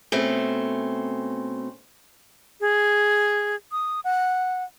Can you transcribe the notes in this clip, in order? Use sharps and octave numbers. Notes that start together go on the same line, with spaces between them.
B2 A3 C4 C#4
G#4
D#6
F#5